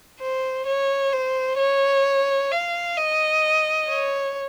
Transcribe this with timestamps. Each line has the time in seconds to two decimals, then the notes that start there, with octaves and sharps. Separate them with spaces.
0.20 C5
0.66 C#5
1.13 C5
1.58 C#5
2.52 F5
2.97 D#5
3.89 C#5